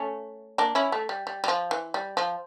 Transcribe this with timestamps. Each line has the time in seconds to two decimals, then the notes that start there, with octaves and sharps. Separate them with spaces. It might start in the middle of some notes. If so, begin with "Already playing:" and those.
Already playing: A3 C#4
0.58 A#3 D4
0.75 C#4 E4
0.92 A3
1.09 G3
1.27 G3
1.44 G3
1.48 F3
1.71 E3
1.94 G3
2.17 F3